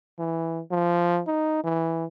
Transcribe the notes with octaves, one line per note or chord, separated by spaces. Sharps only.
E3
F3
D#4
E3